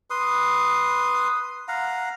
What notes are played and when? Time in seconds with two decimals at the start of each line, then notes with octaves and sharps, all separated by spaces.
0.10 B4 C6 D#6
1.68 F5 F#5 A#5